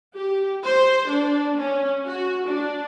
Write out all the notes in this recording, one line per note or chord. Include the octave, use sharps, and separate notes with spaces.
G4
C5
D4
C#4
F#4
D4